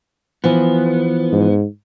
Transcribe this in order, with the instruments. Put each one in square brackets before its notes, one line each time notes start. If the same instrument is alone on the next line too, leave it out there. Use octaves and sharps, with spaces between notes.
[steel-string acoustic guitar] E3 F3 [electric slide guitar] B3
[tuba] G#2